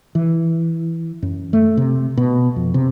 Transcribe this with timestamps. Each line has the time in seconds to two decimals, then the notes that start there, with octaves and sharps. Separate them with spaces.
0.15 E3
1.23 F#2
1.53 A3
1.77 C3
2.17 B2
2.56 F2
2.74 C3